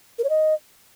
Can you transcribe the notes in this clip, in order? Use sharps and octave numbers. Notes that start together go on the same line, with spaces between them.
A#4
C#5
D#5